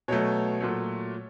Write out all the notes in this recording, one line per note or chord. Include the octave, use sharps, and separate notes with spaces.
B2 F#3 A3 C#5
A#2 F#3 A3